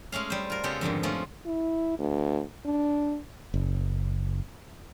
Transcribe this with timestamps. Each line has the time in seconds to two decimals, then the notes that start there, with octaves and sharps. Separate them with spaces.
0.12 G#3 A3 C#4 F5
0.30 G3 C5
0.50 F4 A#4
0.64 C#3 G#3 B3 G4 A4
0.81 F2 G#2 D3 D#3
1.03 F3 G#3 A3 C#4 F4
1.46 E4
1.99 D2
2.65 D4
3.54 F#1